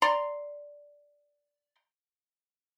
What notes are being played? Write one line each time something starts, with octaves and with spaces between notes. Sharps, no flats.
D5 A#5 C6